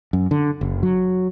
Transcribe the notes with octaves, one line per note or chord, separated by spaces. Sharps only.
F#2
D3
F#1
F#3